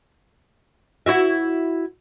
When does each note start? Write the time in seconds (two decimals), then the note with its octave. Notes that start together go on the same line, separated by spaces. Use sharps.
1.06 E4 F#4 E5